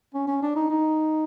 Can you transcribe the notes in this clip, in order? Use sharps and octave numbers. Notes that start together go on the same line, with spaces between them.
C#4
C#4
D4
D#4
D#4